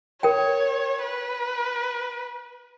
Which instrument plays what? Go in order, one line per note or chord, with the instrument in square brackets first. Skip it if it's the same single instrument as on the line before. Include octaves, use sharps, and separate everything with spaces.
[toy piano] A#4 G5 [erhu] C#5
[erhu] B4